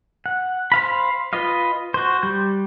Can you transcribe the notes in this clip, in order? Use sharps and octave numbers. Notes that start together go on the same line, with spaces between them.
F#5
C5 F5 B5
F4 B4 D#5 F5
F#4 C5
G3 G6